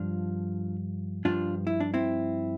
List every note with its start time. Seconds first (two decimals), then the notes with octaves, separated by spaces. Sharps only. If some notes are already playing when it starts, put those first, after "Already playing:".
Already playing: G2 F3 D4 F4
1.25 G2 F3 D4 F4
1.67 E4
1.80 D4
1.94 C4 E4